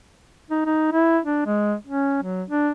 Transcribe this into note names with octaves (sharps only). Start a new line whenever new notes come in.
D#4
D#4
E4
D4
G#3
C#4
F#3
D4